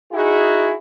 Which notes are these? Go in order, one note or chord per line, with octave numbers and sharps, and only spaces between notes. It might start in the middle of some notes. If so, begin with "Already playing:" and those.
D#4 E4 F#4 G#4